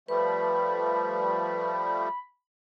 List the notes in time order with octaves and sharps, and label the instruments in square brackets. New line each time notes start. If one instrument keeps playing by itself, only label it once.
[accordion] F3 G3 A3 [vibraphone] B4 [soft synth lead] B5